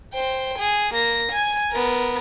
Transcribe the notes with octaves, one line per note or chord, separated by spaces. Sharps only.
C5 G5
G#4
A#3 A#6
G#5 G#6
B3 A#4